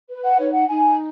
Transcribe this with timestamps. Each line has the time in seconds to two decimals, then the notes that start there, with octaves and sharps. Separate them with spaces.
0.09 B4
0.24 F#5
0.39 D#4 C#5
0.53 F#5
0.68 D#4 G#5